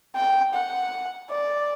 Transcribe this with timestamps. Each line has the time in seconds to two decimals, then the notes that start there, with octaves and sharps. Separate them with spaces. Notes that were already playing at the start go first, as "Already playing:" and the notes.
0.15 G5
0.54 F#5
1.30 D5